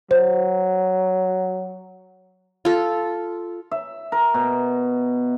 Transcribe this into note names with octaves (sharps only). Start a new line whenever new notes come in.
F#3 C5
F4 A4
E5
A#4
B2